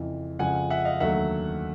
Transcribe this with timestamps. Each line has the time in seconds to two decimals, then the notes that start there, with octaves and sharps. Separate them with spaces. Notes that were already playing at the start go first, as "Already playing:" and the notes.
Already playing: F2 C#3 E3
0.39 F2 C#3 F3 G#3 F#5 G#5
0.70 E5 F#5
0.85 D#5 F5
1.00 D#2 D3 F#3 A3 E5 F#5